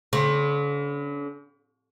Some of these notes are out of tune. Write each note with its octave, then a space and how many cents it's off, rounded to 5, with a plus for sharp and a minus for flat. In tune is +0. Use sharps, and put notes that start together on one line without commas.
D3 -45 C4 +30